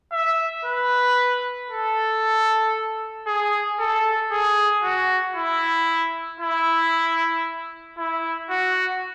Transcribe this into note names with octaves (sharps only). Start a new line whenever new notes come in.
E5
B4
A4
G#4
A4
G#4
F#4
E4
E4
E4
F#4